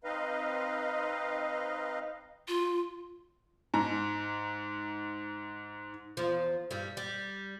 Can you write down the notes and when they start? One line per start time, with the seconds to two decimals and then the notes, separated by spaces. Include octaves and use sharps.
0.04 C4 D#4 B4 D#5 F5
2.48 F4
3.74 G#2 A#5
6.17 E2 F3
6.71 G2 G3
6.97 G3